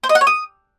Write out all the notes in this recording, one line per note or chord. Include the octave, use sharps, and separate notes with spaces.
C5
D#5
F#5
C#5
D#6